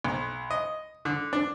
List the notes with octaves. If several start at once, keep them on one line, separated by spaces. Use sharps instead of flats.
B1
D#5
D3
D4